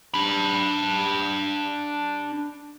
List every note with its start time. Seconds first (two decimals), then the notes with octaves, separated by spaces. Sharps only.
0.14 D4 B5